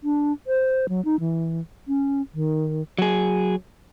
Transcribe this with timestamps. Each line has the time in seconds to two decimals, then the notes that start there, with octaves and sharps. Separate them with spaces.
0.04 D4
0.47 C5
0.89 F#3
1.05 D#4
1.20 E3
1.88 C#4
2.34 D#3
2.98 F#3 G#4